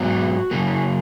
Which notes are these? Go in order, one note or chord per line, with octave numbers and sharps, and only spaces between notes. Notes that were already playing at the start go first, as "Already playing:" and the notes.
Already playing: G#2 F#3 B3 F#4
C#3 F#3 A#3